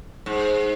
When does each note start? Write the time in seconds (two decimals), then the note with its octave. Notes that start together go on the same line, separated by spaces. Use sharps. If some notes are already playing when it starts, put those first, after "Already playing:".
0.26 G#2